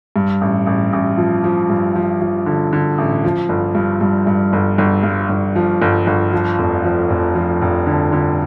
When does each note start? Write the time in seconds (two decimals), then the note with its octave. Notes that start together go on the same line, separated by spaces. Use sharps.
0.16 G2
0.41 A1
0.67 A1
0.93 A1
1.17 F3
1.44 F3
1.70 G2
1.95 F3
2.21 F3
2.46 D3
2.73 D3
2.98 A1
3.24 F3
3.49 G1
3.75 G2
4.01 G2
4.27 G2
4.53 G1
4.78 G1
5.03 G2
5.30 G1
5.55 F3
5.82 G1
6.07 G1
6.33 F3
6.59 F1
6.84 F3
7.10 F1
7.35 F3
7.62 F1
7.86 D3
8.12 D3